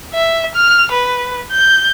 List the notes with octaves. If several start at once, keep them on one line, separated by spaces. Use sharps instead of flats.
E5
F6
B4
G6